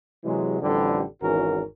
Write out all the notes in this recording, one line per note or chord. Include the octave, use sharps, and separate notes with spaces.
C3 E3 F#3 G#3
A1 F2 D3 G3
G#1 E2 E3 C#4 F#4 A#4